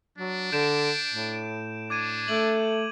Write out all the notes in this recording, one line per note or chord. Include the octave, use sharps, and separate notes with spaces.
F#3 D4
D3 G6 D7 E7
A2
D4 D6 G#6 D#7
A3 F#7